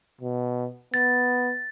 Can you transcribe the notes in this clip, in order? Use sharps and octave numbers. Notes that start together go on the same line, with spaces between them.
B2
B3 A6